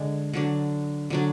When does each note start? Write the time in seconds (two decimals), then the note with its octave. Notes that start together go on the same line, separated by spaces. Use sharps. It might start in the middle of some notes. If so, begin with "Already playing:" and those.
Already playing: D3 G#3 D4
0.33 D3 F#3 D4
1.10 D3 F#3 D4